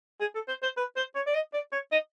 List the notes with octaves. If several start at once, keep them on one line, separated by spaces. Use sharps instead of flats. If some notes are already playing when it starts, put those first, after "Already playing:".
G#4
A4
C5
C5
B4
C5
C#5
D5
D#5
D5
C#5
D#5